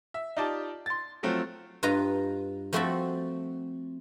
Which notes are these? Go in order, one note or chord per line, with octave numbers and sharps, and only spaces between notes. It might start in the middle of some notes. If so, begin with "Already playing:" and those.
E5
D#4 F4 G4 D5 A5
C6 A6
F3 F#3 A3 C4 F4
G2 F4 B4 D#5 A#5
F3 A3 C4 F#4 A4 B5